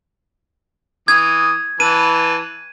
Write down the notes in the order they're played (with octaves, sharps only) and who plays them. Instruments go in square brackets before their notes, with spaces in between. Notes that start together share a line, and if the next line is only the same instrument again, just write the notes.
[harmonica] E3 D#6 [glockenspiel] G#6
[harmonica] E3 B4 A5 [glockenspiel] D#7